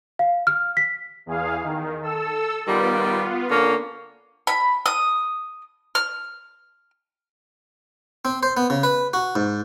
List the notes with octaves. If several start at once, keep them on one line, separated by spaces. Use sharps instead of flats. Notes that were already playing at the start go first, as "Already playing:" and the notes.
F5
F6
B6
E2 G#4 F5
D#3
A4 E6
D#3 G3 B3 F4
D3 A#3 C#4
B5
D#6
F6
C4
C5
B3
C#3
B4
F#4
G#2